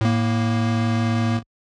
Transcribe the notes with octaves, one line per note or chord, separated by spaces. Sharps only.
A2 A#3